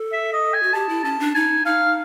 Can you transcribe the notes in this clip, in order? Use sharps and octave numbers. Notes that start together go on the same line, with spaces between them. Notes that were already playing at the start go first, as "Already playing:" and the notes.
Already playing: A4
E5
D#5
G#5
F#4
G4 A5
E4
C#4 A5
D4
D#4 G#5
D#4 F5